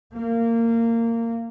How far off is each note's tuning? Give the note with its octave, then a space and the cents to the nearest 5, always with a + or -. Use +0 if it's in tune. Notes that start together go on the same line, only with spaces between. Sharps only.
A#3 -20